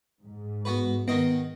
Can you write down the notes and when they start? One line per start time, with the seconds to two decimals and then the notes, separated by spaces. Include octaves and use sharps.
0.23 G#2
0.65 B3 F#4 B4
1.08 D#3 B3 D#5 F#5